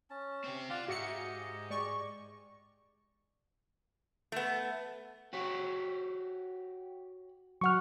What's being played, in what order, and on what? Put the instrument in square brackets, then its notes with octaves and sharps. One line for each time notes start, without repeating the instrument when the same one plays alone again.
[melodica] C#4 A5
[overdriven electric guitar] C4 G4
[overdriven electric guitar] F4 [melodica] D5 F5 F#5
[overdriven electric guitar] G#2 [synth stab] F#4 E5 C#7 [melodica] G4 D#5
[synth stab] G#3 D5 C#6
[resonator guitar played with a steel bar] A3 B3
[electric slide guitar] F#4 G4 C#5
[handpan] F#3 F#5 [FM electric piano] C#6 F6